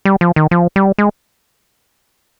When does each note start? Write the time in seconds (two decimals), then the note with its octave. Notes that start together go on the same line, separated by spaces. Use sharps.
0.05 G3
0.21 F3
0.36 D#3
0.51 F3
0.76 G3
0.98 G#3